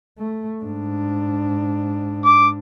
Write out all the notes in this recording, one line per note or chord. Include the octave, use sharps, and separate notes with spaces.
A3
G#2 D4
D6